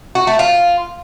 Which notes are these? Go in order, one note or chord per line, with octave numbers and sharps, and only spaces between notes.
F#4
A3
F4